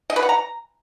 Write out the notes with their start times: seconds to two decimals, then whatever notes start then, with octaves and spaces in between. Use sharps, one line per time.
0.10 D#5
0.16 B4
0.22 F#5
0.29 A#5